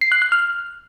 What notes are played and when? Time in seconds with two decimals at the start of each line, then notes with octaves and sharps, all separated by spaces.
0.01 C7
0.12 F#6
0.22 F#6
0.32 F6